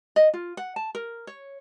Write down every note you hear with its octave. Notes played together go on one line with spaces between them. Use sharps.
D#5
F4
F#5
A5
A#4
C#5